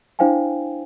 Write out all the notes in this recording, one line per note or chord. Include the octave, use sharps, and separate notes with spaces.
D4 E4 C5 F5 G5 G#5